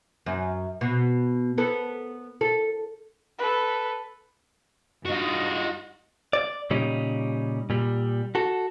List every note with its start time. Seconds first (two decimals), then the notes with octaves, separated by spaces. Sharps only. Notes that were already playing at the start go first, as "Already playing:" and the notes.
0.26 F#2
0.81 B2
1.58 B3 A4
2.41 A4
3.39 A4 B4
5.06 G2 D#4 F4 F#4 D#5
6.33 D5
6.70 A#2 C#3 G3 C#4 D#4
7.70 A#2 G3
8.35 F#4 A4